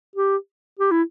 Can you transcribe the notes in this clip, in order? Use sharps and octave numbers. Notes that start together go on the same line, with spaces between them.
G4
G4
E4